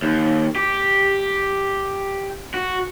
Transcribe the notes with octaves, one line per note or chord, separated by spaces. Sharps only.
D#2
G4
F#4